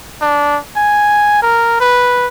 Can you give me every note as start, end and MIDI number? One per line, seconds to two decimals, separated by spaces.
0.22 0.57 62
0.76 1.39 80
1.42 1.78 70
1.80 2.27 71